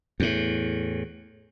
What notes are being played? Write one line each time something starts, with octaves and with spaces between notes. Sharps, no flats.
E2 A2